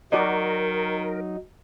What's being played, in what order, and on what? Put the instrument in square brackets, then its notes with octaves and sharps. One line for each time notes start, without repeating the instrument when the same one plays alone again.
[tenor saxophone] D#3 [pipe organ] F#3 D#4 [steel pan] F#4 D5 D#5 [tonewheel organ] A#4